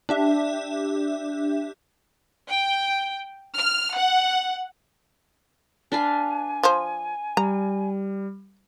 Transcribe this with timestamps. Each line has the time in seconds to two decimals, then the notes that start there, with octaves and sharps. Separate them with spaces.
0.09 D4 G4 E5
2.50 G5
3.56 F6
3.96 F#5
5.92 D4 B4 F5 G#5
6.63 F3 C5
7.37 G3 A#5